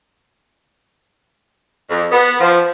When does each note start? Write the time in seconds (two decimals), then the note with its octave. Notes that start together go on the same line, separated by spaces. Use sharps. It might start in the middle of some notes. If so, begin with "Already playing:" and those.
1.90 F2
2.12 B3
2.39 F3